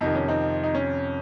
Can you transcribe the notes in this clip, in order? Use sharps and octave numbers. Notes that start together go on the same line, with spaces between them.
F2 C3 D#3 D#4
C#4
C4 D#4
D#4
C#4